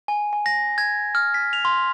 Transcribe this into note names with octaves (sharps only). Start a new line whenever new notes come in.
G#5
G#5
A#6
G#6
F6
B6
F7
C6